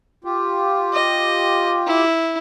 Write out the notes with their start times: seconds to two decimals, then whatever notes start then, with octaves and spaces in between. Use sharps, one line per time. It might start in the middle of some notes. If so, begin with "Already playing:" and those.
0.24 F4 G4
0.93 D#5
1.86 E4